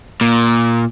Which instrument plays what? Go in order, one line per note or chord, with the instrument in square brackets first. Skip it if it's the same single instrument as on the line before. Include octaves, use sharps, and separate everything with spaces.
[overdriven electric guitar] A#2